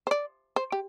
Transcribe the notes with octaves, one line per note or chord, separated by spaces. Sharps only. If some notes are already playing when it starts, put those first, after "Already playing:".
C5
D5
C5
G4